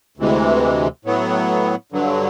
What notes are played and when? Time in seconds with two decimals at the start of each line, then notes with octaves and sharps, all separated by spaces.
0.17 D2 C3 E3 G#3
1.05 A2 F#3 B3
1.92 G2 D3 F#3